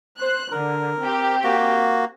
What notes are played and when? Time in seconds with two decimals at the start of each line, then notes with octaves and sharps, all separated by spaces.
0.19 C5 F#6
0.51 D3 A#4
1.01 C4 G4
1.44 A#3 F#4